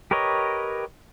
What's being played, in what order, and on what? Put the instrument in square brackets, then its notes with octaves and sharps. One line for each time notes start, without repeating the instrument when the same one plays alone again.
[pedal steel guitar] G4 A#4 B4 C#5 D#5